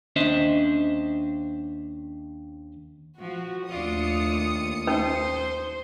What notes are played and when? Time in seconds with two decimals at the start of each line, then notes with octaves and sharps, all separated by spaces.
0.16 D#2 C#4 D4 C5 D#5 E5
3.19 F3 F#4
3.70 D#2 A3 D4 F4 D#6 C#7
4.87 C#4 D#4 B4 C5